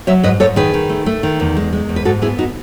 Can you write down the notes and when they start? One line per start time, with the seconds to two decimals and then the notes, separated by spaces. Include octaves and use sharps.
0.07 F#3 C#5 E5
0.23 G#2 B4 D#5
0.40 G#2 A4 C#5
0.56 D#3 G#4 B4
0.74 D#3
0.89 A3
1.06 A3
1.23 D#3
1.40 E2
1.56 G#3
1.73 G#3
1.89 E2
1.96 B4
2.05 G#2 F#4 A4
2.22 B3 E4 G#4
2.39 D#4 F#4